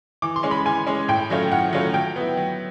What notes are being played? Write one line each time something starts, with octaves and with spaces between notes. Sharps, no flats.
E3 D6
C6
G#3 C#4
B5
E3 G#5
G#3 C#4
A2 G5
F#3 A3 C#4 F4
A2 F#5
F#3 A3 C#4 F4
F#3 G5
B3 E4
F#3